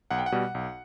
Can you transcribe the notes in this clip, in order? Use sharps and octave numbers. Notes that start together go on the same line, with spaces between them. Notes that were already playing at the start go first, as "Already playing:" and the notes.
B1 F#5
G5
F#5
B2 G3
B1